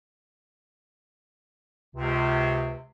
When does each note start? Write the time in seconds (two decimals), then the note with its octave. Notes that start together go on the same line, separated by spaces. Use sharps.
1.95 C#2 C3